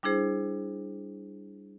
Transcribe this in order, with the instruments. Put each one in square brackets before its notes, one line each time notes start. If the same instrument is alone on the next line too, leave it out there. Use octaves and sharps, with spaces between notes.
[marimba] G3 D4 E4 G#4 C5